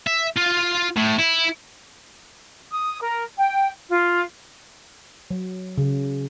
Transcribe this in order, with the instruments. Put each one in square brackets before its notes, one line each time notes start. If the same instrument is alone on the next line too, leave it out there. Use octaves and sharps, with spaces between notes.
[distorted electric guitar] E5
F4
A2
E4
[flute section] D#6
A#4
G5
F4
[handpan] F#3
C#3